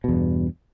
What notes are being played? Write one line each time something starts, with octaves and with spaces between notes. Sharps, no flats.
E2 G2 B2